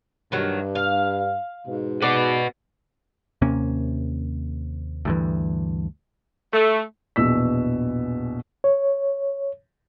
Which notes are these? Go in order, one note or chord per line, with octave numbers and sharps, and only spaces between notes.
G2 D#3 F#3
F5
G#2 B2
F#4 B4 D5 F#5
D#2 C3 A#3 C#4
D2 G2 E3
A3
A#1 E2 B2 E6 B6
C#5